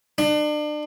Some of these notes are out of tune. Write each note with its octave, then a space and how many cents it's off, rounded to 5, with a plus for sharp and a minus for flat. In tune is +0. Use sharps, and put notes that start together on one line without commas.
D4 +35